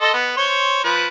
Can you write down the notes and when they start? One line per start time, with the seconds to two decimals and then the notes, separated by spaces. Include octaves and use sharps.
0.01 A4 D#5 C6
0.13 B3
0.37 C5 C#5 C6
0.84 F3 B4